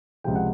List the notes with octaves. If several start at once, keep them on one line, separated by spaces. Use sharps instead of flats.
C#2 C3 F3 G5
F#5